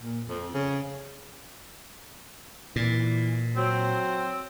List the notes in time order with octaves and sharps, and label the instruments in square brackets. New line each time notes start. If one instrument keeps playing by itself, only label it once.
[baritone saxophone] A#2
F2
C#3
[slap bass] A#2 [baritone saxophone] E3
[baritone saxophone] F#3 [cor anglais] C4